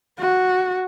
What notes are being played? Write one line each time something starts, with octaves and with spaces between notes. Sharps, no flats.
F#4